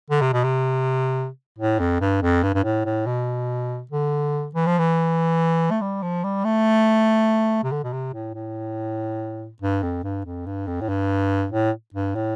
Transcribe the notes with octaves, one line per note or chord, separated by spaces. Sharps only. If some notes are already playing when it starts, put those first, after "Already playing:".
D3
C3
B2
C3
A2
F2
G2
F2
G2
G2
A2
A2
B2
D3
E3
F3
E3
A3
G3
F3
G3
A3
C3
D3
B2
C3
A2
A2
G2
F2
G2
F2
G2
F2
A2
G2
A2
G2
A2